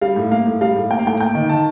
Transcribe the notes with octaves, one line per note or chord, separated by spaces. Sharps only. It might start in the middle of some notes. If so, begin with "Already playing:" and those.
G3 F5
A2
A#3 F5
A2
G3 F5
A2
A#3 G5
F5
A2 G5
A#3 G5
D#3
D#3 A5